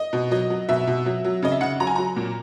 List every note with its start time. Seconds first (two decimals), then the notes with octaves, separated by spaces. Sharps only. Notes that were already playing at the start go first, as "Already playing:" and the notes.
Already playing: D#5
0.13 B2
0.31 F#3 D#5
0.50 F#3
0.69 B2 E5
0.87 B2
1.06 F#3
1.25 F#3
1.43 C#3 D#5
1.52 E5
1.61 C#3 F#5
1.80 F#3 A#5
1.87 G#5
1.96 F#3 A#5
2.16 A#2